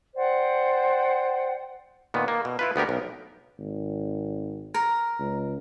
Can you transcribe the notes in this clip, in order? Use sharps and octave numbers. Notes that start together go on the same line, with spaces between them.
C5 D5 F#5 G5
A#2 D#3 B3
A#3
B2
E4 F4 B4
D2 B3 G4 A#4
B1
G#1
A#4
C#2